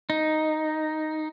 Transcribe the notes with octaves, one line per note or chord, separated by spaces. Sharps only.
D#4